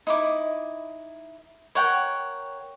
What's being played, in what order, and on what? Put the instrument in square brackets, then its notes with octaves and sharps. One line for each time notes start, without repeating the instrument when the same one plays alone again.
[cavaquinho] D#4 E4 D6
A#4 C#5 F#5 G5